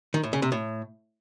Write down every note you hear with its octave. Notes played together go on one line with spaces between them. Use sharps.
D#3
A2
C#3
C3
A2